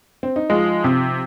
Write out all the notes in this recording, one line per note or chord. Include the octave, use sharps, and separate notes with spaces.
C4
D#4
F3 G#3 F4
C3